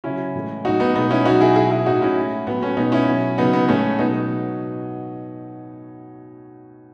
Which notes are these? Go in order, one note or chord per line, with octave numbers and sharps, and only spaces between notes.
C#3 F#3 C#4 E4
A2 E3 G#3
A2 F#3 D#4 F#4
B3 D#4
B2 G#3 B3 D#4
C#4 E4
B2 F#3 D#4 F#4
E4 G#4
B2 F#3 E4 G#4
E4 G#4
A2 F#3 D#4 F#4
C#4 E4
A2 G#3
A2 F#3 B3
A3 C#4
B2 G#3 B3 D#4
C#4 E4
B2 F#3
C#3 F#3 B3 D#4
B3
A2 G#3 A3 C#4
B2 F#3 B3 D#4